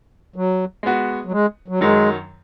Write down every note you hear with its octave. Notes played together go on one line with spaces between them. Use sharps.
F#3
G#3 B3 F#4
F#3
G#3
F#3
F#2 D#3 F#3 G#3